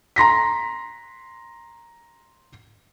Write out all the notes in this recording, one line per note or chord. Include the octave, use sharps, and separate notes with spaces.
A#5 C6 A#6 B6